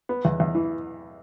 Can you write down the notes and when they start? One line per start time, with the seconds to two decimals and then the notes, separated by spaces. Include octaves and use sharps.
0.09 B3
0.25 E2
0.40 E2
0.55 E3